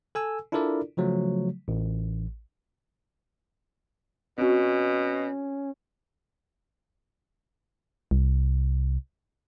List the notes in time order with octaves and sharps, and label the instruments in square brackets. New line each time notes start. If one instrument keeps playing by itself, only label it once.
[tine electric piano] A4 G#5 E6
D4 E4 F4 A4 A#4 D5
C#3 F3 F#3 A3
A1
[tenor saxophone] B2 [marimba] C4 F#4 [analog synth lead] C#4
[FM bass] C2